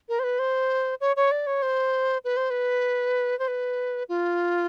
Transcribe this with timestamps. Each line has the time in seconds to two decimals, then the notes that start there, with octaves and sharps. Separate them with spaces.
0.09 A#4
0.19 C5
0.24 B4
0.39 C5
1.01 C#5
1.16 C#5
1.31 D5
1.47 C#5
1.62 C5
2.24 B4
2.37 C5
2.50 B4
3.39 C5
3.48 B4
4.09 F4